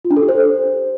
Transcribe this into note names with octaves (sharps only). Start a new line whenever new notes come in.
F4
D4
A4
G4
C5